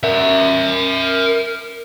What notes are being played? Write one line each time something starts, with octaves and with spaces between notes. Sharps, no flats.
A#4 E5